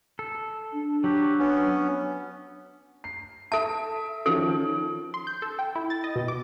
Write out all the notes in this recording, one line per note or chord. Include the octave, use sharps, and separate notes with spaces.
A4
D4
F#3 G4
B3 C#4
C7
A4 E5 A5
D#3 F3 C#4 A4
C6
G6
A4
G5
E4
A6
D#5
B2
D6